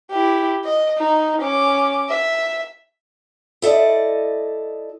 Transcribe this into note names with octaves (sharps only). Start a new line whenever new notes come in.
E4 G4
D#5
D#4
C#4 D6
E5
E4 A4 D5 D#5